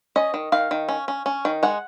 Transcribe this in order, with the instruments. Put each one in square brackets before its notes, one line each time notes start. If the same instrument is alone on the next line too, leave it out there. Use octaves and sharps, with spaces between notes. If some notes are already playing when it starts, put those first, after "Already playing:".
[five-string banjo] C#4 D#5
D#3
D#3 F5
D#3
C#4
C#4
C#4
D#3
G#3 F#5